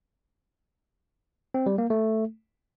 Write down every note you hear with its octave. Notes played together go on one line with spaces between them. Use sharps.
C4
G3
A#3
A3